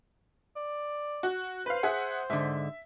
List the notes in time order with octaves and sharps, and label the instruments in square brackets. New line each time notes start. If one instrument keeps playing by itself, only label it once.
[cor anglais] D5
[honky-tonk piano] F#4
[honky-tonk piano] B4 F5 [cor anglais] C5
[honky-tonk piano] G#4 E5 F#5
[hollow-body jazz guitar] G#2 D3 [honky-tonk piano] E5